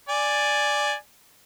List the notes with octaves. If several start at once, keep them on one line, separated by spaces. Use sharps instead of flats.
D5 G#5